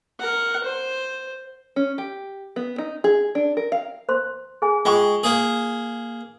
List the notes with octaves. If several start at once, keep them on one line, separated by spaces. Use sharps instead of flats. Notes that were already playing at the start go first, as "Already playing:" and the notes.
A#4 F#5
C5
C#4
G4
B3
D#4
G#4
D4
A#4
F5
C5 C6
G#4 G#5
G#3 F4 G5 C#6
A#3 G#4